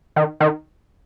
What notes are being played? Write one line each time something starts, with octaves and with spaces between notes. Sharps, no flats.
D#3
D#3